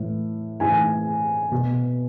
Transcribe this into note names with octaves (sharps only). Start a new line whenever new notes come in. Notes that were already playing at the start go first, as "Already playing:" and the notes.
Already playing: A2 E3
A2 E3 G#5
B2